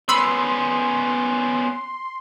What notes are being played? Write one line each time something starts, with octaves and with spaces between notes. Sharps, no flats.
B3 C#4 B5 C6 E6